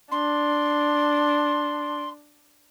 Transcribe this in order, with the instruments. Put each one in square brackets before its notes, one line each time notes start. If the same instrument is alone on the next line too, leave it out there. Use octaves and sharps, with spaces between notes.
[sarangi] D4 [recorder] C6